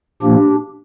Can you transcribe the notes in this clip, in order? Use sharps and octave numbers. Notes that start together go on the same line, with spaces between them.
A#2 F3 A#3 D4 G4